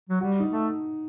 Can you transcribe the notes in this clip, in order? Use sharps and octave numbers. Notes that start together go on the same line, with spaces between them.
F#3
G3 F#4
D#4
A3